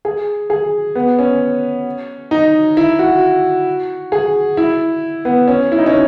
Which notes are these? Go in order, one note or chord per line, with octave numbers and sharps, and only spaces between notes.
G#4
G#4
B3
C#4
D#4
E4
F#4
G#4
E4
B3
C#4
E4
D#4
C#4